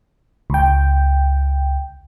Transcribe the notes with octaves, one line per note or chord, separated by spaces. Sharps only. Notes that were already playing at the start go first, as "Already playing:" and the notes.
C#2 G5